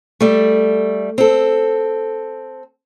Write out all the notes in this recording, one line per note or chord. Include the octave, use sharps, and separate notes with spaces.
G3 A3
C4 A4